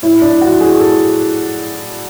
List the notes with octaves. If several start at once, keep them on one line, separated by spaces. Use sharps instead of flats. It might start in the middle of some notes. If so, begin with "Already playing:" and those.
A2 E4
D4
A2
F#4
A2 G#4
A4
A2